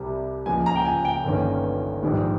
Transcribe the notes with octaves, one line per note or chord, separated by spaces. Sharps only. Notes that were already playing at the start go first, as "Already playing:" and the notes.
Already playing: C2 C3 G3
C#2 C#3 F3 A#3 G#5
A#5
G5
G#5
G5
G1 G2 D#3 A#3 C#4
A#1 G#2 D#3 G3